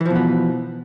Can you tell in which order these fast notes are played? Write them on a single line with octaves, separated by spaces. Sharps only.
E3 F3 B2 B3